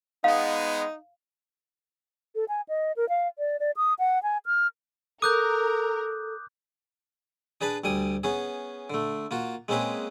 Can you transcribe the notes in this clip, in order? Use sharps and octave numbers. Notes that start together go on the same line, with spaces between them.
G#3 B3 D#4 F5
A4
G#5
D#5
A#4
F5
D5
D5
D#6
F#5
G#5
F6
A4 A#4 D6 D#6 F#6 G6
D4 G#4 B4 A5 B5
D2 G3 G#5 D#6
B3 C#4 G#4
D3 A3
A#3 F4 F#4
G#3 A#3 C4 C#4 G#4 B4